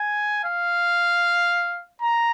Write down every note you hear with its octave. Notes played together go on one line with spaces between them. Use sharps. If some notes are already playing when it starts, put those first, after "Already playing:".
Already playing: G#5
F5
A#5